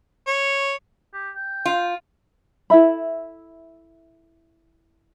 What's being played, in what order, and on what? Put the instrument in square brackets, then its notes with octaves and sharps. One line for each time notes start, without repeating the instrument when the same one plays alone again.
[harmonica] C#5
[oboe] G4
G5
[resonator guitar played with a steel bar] F4
[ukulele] E4 A4 E5 B5